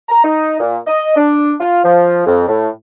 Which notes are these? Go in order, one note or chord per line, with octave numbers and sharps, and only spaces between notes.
A#5
D#4
A#2
D#5
D4
F4
F3
F2
A2